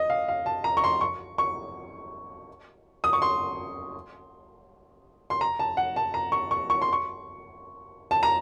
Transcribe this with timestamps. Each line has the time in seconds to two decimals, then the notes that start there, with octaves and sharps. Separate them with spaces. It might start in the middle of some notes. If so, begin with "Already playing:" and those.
Already playing: D#5
0.10 F5
0.28 F5
0.46 A5
0.64 A#5
0.77 C#6
0.84 C6
1.01 C#6
1.38 C#6
3.04 D#6
3.13 C#6
3.22 C6
5.30 C6
5.41 A#5
5.59 A5
5.77 F#5
5.96 A5
6.14 A#5
6.32 C#6
6.51 C#6
6.70 C#6
6.82 C6
6.93 C#6
8.11 A5
8.23 A#5